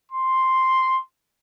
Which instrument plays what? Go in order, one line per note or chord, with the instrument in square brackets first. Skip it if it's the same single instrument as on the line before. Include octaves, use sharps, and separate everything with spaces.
[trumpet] C6